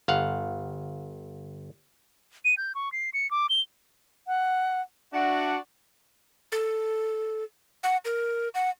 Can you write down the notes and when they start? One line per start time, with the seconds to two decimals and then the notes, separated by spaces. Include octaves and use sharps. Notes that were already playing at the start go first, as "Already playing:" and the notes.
0.08 G1 F5 F#5
2.45 D#7
2.57 G6
2.75 C#6
2.92 C7
3.14 C#7
3.31 D6
3.49 G7
4.27 F#5
5.13 D4 F#4 E5 F#5
6.52 A4
7.83 F#5
8.05 A#4
8.55 F#5